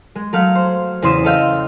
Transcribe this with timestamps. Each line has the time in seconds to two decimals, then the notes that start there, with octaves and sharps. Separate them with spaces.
0.15 G#3
0.33 F#3 A3 F5
0.55 C5
1.02 E2 C#3 C4 C6 D#6 E7
1.24 A4 D#5 F5 G5 E6 G6